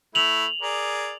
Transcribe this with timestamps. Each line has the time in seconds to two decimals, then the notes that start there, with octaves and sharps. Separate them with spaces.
0.15 A3 E4 F7 F#7
0.62 G#4 A#4 D5